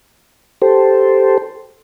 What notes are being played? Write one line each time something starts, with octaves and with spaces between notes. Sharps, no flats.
G4 A4 C5